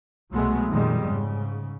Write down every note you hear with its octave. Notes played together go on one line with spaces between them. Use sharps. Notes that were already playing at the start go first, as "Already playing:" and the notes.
C2 B2 F#3 G#3 A3 B3
F2 A#2 D#3 G3 G#3
G#2 C#3